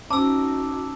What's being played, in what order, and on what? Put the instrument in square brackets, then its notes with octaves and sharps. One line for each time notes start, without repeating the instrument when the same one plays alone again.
[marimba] C#4 C5 [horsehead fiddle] D#4 F#4 [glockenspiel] A5 E6 [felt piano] D6